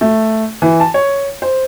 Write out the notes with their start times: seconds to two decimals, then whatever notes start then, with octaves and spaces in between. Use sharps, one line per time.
0.01 A3
0.62 E3
0.80 A5
0.94 C#5
1.42 C5